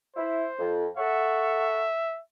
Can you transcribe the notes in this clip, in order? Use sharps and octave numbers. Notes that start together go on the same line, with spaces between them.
E4 C5
F2
A4 E5 F#5 C#6